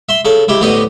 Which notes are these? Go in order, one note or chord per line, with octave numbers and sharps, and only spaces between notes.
E5 C6
C#3 A4
C#2 E4 G4
D2 A2 B3 G4 D#5